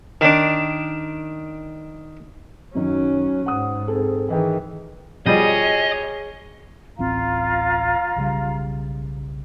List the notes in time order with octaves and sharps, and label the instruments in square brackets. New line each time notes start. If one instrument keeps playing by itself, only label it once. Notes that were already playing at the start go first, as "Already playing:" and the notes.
[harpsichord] D#3 D4
[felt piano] F#2 D#3 D#4 [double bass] F#3 C#4
[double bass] G#2 [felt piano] F#5 D#6
[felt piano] C4 G#4 A4
[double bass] D#3 E3 [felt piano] G#4 D#5 G5
[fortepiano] B2 F3 G3 [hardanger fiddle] G#4 C#5 [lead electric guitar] D#5
[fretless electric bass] D1 A1 C4 [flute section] F4 F5 A#5
[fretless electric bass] B1 C#3 G3